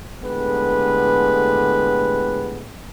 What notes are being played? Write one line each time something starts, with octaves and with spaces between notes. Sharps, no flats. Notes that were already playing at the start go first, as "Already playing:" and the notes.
A2 D3 G#3 B3 G4 B4